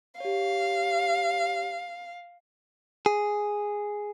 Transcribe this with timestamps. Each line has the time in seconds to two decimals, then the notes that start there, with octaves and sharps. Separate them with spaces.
0.20 G4 C#5 F5
3.06 G#4